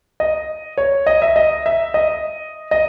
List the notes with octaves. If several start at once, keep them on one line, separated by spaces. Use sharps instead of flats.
D#5
C#5
D#5
E5
D#5
E5
D#5
D#5